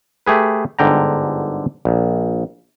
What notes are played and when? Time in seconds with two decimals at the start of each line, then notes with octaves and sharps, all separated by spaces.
0.26 A3 G4 G#4 B4
0.79 G1 G#2 D3 G5 A#5
1.85 A#1